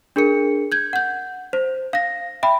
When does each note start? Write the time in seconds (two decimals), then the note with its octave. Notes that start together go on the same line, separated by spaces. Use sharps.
0.16 D4 G#4 A#4 C#7
0.72 G6 G#6
0.93 F#5 G6
1.53 C5
1.93 F5 A#6
2.43 E5 G5 B5